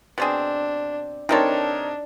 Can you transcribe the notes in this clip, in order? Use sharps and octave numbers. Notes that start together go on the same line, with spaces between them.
B2 C4 D4 G#4
C3 C4 D4 D#4 A4 A#4 C#5